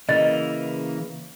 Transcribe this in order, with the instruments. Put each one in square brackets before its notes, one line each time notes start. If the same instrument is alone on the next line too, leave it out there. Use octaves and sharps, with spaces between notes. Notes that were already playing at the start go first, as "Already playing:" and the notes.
[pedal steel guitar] C#3 E3 A#3 [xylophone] D#5 A6